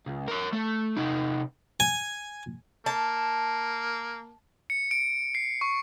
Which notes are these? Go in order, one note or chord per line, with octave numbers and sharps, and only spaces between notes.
C#2
A#4 C#5
A3
C3 D#4
G#5
A#3 A5
C#7
D7
C7
C#6